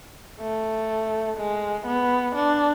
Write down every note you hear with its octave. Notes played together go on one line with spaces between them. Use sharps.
A3
G#3
B3
D4